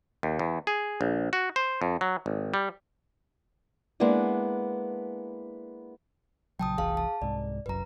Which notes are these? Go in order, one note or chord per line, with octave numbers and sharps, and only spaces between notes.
D#2
E2
G#4
A#1
F#4
C5
F2
F#3
G#1
G3
G#3 A#3 B3 D4 E4
A#1 C#3 F#3 G5 A5 D#6
F1 B1 E3 G#4 F5 A5
A5
C2 G#2 D5
F#1 C2 F#2 B4 A#5